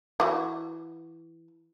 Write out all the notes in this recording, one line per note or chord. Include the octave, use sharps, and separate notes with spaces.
E3 F#4